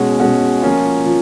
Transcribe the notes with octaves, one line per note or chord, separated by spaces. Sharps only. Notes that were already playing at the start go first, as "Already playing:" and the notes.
Already playing: B2 G#3 C#4 F#4
B2 G#3 C#4 F#4
F3 A#3 C#4 F4
F3